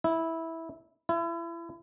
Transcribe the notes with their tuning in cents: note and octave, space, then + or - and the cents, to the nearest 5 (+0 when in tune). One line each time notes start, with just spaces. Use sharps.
E4 -10
E4 +35